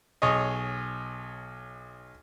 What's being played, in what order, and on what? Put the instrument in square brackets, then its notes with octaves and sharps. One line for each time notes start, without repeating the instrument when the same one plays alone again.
[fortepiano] B1 G#4 C#5 D#5